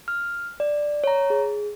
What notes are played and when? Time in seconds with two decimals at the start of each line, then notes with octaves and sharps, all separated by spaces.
0.08 F6
0.60 D5
1.04 C#5 A#5
1.30 G#4